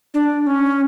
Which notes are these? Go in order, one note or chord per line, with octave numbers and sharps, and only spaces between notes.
D4
C#4